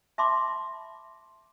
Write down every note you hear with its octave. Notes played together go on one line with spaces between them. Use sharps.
E5 A5 B5 C6 D6